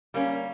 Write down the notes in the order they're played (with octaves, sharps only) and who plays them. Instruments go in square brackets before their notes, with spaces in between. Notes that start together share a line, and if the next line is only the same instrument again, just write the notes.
[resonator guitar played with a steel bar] G3 A#3 C#4